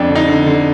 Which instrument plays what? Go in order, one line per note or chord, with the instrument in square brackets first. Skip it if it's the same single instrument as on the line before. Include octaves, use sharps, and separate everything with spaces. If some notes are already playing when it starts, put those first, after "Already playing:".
Already playing: [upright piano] F2 D4
D3
D#4
D3
D3